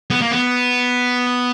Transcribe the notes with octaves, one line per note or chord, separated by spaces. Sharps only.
B3
A#3
B3